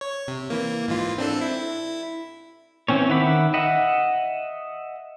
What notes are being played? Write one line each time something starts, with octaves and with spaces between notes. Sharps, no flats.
C#5
C3
E3 A#3
G#2 E3 F4
C4 D4 A4
E4
E3 C4 C#4 C#5
D#3 E5 F#5 B5 D6
D#5 E5 F#5